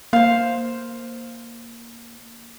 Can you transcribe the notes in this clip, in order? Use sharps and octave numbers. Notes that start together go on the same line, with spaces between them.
A#3 C5 F5